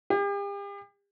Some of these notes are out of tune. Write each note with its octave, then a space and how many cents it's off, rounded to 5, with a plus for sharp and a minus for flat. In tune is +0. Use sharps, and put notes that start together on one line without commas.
G4 +40